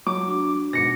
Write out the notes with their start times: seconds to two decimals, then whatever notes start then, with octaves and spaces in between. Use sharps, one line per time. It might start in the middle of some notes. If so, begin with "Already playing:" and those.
0.06 F#3 D6
0.28 D4 F#4
0.73 G#2 B2 A#6 C#7